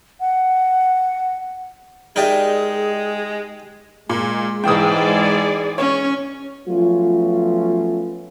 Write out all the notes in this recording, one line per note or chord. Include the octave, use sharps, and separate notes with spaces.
F#5
G#3 D#4 G4 G#4 A#4 D5 E5
A#2 G#3
G#2 E3 G#4 D5 G5 D#6
C#4 C#5
F3 F#3 A3 B3 C#4 F4